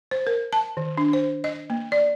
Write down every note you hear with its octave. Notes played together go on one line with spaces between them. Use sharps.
C5
A#4
A5
D#3
D4
C5
D#5
A#3
D5